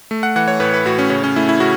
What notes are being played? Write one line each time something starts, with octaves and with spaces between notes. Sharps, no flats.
A3
F#5
E3 F#5
C#5
A2 B4
B4
A2 F#4
C#4
C#3 C#4
C#4
A3 E4
E4
C#3 F#4